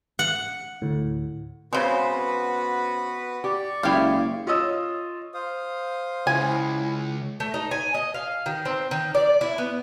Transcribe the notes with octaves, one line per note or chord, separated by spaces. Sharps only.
F#5
D2 A2
C#3 G#3 B3 C4 F#4 B4 C5
G4 D5 C#6
F#1 G#3 E4 G4 F5
F4 C#5 D#5 D#6 E6
C5 F5 D#6
C#2 E4 G#5
A3
D#4
G#5
D#5
F5
D#3
C4
D#3
D5
E4
B3